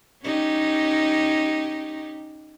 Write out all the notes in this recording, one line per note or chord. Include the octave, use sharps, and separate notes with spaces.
C#4 D#4 G4